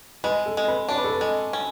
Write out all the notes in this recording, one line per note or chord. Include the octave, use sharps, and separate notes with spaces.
G#3 B4
A4
G#3
B4
D4 C#5
B4
A4
B4
G#3
C#4